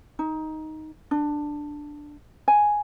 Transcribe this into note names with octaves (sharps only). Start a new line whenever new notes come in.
D#4
D4
G#5